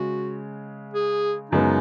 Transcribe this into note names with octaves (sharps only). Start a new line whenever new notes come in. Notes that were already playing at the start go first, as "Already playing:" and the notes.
Already playing: C#3 G#3 F#4
G#4
F#2 C#3 G#3 B3 D#4